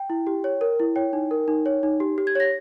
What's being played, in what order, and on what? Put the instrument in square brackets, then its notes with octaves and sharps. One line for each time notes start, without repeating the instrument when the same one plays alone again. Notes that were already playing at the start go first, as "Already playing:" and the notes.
Already playing: [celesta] G5
E4
G4
C#5
A#4
E4
C#5 G5
D#4
A#4
D#4
C#5
D#4
G4
G4
G#6
C#5 A#6